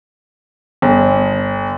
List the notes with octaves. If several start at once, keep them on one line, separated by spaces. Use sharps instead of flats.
G1